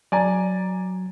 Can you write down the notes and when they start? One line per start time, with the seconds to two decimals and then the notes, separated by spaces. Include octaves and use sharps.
0.12 F#3 D5 G#5 A#5